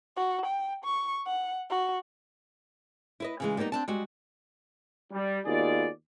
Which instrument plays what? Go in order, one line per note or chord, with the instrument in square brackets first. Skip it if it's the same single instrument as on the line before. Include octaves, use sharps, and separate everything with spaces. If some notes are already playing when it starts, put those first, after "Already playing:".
[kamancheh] F#4
G5
C#6
F#5
F#4
[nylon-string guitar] E4 B4 D#5
C#3 E3 G#3
G3 A#3 B3 D4 D#4
C4 D4 A5
G3 G#3 F#4
[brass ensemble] G3
D#2 B2 F4 G#4 D5